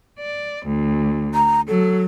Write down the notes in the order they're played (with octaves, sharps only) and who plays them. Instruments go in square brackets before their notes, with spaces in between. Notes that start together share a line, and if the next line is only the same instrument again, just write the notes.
[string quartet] D5
D2
[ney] A#5
[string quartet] F#3 [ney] A4